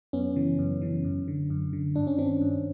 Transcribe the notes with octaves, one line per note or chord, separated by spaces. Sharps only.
F#2 B3 C#4
C#3 E3
F#2
C#3 E3
F#2
D3
F#2
D3
G2 D4
C#4
D#3 C4 D4
G2